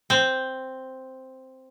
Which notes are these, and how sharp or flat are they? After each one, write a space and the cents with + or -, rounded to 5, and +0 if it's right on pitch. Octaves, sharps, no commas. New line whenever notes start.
C4 +0